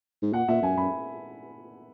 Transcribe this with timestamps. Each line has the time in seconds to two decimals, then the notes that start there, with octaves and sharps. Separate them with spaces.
0.22 G#2
0.33 A#2 F#5
0.48 A#2 E5
0.62 F#2 G#5
0.77 F#2 B5